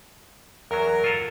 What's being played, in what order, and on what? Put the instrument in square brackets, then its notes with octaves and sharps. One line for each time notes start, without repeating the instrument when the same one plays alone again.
[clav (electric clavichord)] E2 F#3 [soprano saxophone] A#4
[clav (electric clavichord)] F4 A4 F5